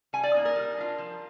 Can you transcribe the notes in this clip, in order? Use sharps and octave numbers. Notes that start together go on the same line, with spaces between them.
G3 G#5
D5
A#3 D#4
A#4
G3
D4 F4
F3